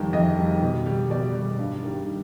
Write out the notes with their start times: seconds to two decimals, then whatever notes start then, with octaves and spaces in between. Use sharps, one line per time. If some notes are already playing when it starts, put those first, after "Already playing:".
Already playing: F2 D#3 G3 G5
0.13 F2 D#5
0.38 D#3 G3
0.62 B2
0.86 G3
1.10 B2 D5
1.35 G3
1.59 G2
1.83 D#3 G3